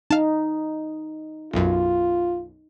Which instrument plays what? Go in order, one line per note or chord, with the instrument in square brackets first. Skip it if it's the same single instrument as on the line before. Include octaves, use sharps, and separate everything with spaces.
[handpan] D#4 [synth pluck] F5 A5
[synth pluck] B1 F#2 [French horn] F4